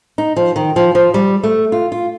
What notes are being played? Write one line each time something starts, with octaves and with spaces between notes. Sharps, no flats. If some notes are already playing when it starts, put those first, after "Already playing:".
D#4
F3
D#3
F3
F3
G3
A3
F4
F4